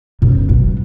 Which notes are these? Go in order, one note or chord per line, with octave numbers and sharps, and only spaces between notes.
F#2 B2
F#3